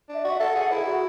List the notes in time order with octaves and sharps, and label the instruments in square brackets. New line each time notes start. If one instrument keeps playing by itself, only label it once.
[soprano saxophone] D4
[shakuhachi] E5
D5
[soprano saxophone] F#4
[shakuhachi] E5
[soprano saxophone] A4 [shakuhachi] F#5
[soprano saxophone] G#4 [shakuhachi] F#5
[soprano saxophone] E4 [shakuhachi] G#4
[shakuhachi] F#4